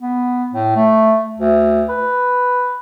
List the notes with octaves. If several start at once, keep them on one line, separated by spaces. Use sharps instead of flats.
B3
A2
A3
D2
B4